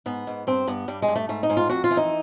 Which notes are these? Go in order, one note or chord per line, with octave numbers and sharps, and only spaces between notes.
G#2 B3
G#2
G2 C4
G2 B3
G2 G3
G#3
G2
A3
G#2 A3
D#4
G#2
F4
F2 F#4
F4
E3
D#4